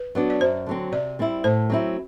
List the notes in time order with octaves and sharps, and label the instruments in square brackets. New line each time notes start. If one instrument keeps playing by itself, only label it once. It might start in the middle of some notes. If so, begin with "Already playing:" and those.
Already playing: [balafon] B4
[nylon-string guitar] F#3 B3 D4
[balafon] D5
[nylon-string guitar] F#2 [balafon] C5
[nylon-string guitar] D3 F#3 C4
[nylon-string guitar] C3 [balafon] D5
[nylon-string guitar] G3 C4 E4
[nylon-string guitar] A2 [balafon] C5
[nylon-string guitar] F#3 C4 E4